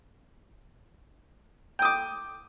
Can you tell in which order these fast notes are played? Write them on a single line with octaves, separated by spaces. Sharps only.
G5 D#6 D6